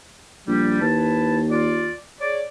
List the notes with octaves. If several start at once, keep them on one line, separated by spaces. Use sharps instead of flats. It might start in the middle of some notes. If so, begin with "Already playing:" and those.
A#1 G3
D#2 E4 B4 A5
F4 D5
G#4 C#5 D5